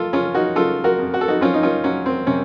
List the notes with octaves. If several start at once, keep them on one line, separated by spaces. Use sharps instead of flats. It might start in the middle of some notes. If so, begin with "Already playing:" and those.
Already playing: A#3 F4 A4
C#3 C#4 F4
D#4 F#4
C#3 F4 A4
F#4 A#4
F2
F#4
A4
D#4 F#4
C4 C#4 F4
D#4
C#4 F4
F#3 C#4
C4
C3 C#4